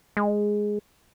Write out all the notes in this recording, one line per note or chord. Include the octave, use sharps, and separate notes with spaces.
G#3